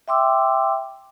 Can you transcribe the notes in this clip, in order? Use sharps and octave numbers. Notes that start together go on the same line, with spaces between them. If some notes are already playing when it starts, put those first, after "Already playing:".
E5 G5 C6 D6 E6